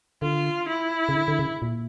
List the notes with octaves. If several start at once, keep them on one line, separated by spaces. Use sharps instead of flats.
D3 F4
E4
C#3
D3
D3
C#3
A#2